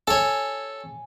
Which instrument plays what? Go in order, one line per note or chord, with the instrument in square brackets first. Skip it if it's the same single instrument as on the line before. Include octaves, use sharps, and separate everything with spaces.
[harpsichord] A4 C#5 [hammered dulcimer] G#5